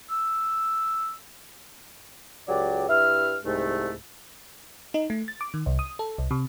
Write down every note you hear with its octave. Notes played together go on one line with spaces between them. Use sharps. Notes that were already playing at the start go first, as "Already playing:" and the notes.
E6
C#2 F#3 G4 D5
G2 E4 E5 F6
C2 G#2 A3
D#4
A3
A6
D6
D#3
C2
D#6
A4
C2
C3